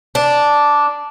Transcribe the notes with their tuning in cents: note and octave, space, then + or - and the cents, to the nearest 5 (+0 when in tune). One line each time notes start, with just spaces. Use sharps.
D4 -5